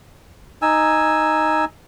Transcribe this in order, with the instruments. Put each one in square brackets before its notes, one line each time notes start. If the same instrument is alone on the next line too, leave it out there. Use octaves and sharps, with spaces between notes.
[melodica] D#4 G#5 E6